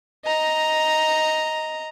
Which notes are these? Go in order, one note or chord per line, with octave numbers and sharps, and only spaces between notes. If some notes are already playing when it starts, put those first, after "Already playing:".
D#5 A#5